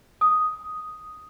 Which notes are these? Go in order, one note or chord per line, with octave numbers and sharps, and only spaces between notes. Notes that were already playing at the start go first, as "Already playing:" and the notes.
D#6